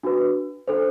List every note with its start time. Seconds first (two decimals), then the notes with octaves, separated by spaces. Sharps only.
0.03 D4 F#4 B4
0.68 D4 A4 C5